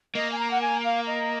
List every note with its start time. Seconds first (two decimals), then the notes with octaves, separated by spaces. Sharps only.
0.15 A#3 D#5
0.31 G#5
0.39 A#5
0.51 F#5
0.61 G#5
0.84 F5
1.07 D#5